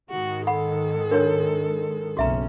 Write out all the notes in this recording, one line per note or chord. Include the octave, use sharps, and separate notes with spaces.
G#2 D#3 G#3 F#4
A4 F#5 B5
D4 F#4 A#4 C#5
F#1 B1 C#4 F#4 E5 A#5